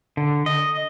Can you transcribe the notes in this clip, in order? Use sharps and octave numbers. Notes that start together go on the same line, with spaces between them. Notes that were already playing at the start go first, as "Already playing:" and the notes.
D3
D#5